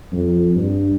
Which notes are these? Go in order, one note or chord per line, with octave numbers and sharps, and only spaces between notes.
F2
G2